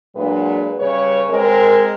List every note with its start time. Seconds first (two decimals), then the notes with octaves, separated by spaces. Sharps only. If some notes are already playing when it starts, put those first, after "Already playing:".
0.15 A#2 F#3 G#3 D4 B4
0.79 C#3 G3 B4 C#5
1.30 G#3 C4 A#4